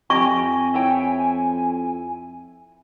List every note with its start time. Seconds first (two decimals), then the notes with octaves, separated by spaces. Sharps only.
0.10 F2 G4 D#5 G5 G#5 C#6
0.74 E4 C#5 G5